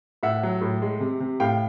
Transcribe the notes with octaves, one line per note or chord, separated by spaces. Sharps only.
A2 E5 F#5
F#3
A2
G#3
C3
C3
A2 F5 G5